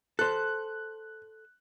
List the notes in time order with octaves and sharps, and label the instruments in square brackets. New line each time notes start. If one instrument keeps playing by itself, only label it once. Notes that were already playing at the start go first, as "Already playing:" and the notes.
[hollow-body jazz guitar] A4 C5 [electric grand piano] F#6